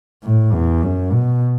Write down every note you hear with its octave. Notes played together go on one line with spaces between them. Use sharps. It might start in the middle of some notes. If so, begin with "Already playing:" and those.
A2
E2
F#2
B2